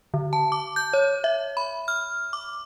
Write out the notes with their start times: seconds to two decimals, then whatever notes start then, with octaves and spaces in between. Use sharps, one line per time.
0.14 D3
0.33 A5
0.52 D6
0.76 G6
0.93 C#5
1.24 E5
1.57 B5
1.88 F6
2.33 D6